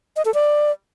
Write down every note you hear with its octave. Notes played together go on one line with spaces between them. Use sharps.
D#5
A4
D5